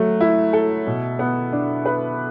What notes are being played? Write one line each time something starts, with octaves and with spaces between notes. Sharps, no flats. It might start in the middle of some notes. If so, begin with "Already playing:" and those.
Already playing: F#3 A3
E4
A4
B2
B3
D4
B4